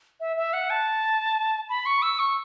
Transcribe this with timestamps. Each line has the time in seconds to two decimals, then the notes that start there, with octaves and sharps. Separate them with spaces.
0.20 E5
0.37 E5
0.53 F#5
0.70 A5
1.69 B5
1.86 C#6
2.02 E6
2.19 C#6